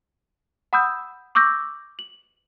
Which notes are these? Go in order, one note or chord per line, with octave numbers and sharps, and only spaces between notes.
F#5 B5 D#6 E6 G6
C#6 D6 E6 G6 A#6
F#7